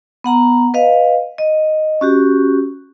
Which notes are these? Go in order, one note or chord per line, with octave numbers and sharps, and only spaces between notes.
B3 F#5 A#5
B4 D#5 F5
D#5
C#4 F#4 G4